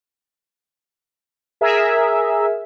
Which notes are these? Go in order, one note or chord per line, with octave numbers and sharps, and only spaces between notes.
G#4 A#4 E5